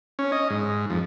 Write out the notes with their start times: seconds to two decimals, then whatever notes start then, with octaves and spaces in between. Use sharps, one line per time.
0.19 C#4
0.32 D#5
0.50 G#2
0.90 F2